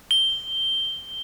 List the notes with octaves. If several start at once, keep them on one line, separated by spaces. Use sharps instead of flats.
G7